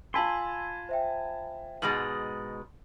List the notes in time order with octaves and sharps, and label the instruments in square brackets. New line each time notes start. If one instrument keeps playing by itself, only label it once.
[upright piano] F4 A5 B5 [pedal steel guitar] G#5 C6 [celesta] E6 B6 F#7
[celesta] C5 E5 G5
[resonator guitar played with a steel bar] G#2 B2 G#3 [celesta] A6 A#6 F#7